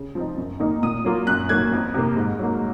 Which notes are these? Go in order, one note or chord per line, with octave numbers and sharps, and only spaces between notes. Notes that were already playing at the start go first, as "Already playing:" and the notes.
Already playing: C#3
F3 C4 D#4
F#2
D#3 A#3 D#4
A#2 D#6
F#3 A#3 F4
F#2 F#6
D#3 F#3 A#3 G#6
F2
C3 D#3 A#3
G#2
F#3 A#3